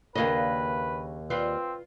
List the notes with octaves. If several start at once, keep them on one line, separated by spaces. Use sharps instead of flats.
D#2 C#3 A#3 D4 B4 D#5
C4 F4 B4 D5